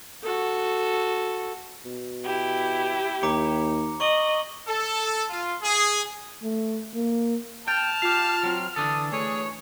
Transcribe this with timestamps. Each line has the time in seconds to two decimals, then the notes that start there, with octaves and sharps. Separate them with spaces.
0.23 F#4 A4
1.85 B2
2.25 E4 G4
3.23 D#2 A#5 D6 C#7
4.00 D#5 C#6 F#7 G7
4.67 A4
5.30 F4
5.62 G#4
6.43 A3
6.94 A#3
7.68 G5 A5 F6
8.02 F4 G4 F5
8.43 F#3 C4
8.76 D3 E3 D4 A4 D#6
9.12 A3 G#4 C#5